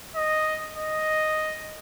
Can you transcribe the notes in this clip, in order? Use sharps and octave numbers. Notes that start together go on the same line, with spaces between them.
D#5
D#5